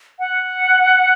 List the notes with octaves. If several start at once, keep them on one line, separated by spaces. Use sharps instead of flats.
F#5